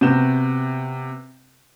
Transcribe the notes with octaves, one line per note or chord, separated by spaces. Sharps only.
C3 B3 F#4 G6 E7